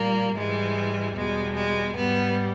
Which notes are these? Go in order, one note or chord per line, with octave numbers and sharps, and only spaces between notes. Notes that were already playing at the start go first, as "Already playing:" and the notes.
Already playing: A#2 G3 A#3
G#2 E3 G3 G#3
E2 B2 G3 G#3
G#3
G#2 G3 B3